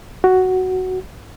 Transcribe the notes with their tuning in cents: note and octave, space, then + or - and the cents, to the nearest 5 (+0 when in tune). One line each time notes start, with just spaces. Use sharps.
F#4 +5